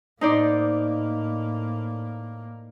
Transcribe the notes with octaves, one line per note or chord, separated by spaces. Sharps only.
A2 A#3 D#4 C5 D5